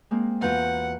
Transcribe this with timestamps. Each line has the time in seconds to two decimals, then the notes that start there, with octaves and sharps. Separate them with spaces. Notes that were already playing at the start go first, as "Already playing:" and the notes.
0.11 G#3 A#3 C4
0.42 E2 B3 F4 F#4 F#5 A#5 G6